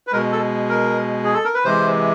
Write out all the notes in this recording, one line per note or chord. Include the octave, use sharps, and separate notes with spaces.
B4
B2 G#3 A#4
A4
A#4
G#4
A4
A#4
B4
C3 E3 G#3 C5